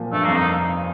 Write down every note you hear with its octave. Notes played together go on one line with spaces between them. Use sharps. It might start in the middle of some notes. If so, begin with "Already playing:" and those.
Already playing: A#2 F3
G2 A3
F2 A#3
D#4